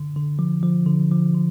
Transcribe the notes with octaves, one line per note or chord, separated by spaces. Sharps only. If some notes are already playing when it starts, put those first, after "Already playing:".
Already playing: D3
D3
F3
F3
D3
F3
D3